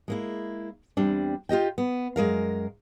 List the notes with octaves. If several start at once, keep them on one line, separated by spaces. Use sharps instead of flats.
G#3 A#3 E4
E2 G3 C4 D4
F4 G4 D#5 G5
B3
F#2 G#3 A#4 F5